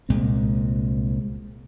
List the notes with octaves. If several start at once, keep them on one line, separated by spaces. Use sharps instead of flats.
C2 A#2 G#3 C4